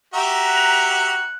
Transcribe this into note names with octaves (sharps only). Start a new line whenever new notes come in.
F#4 G4 E5 A#5
F#5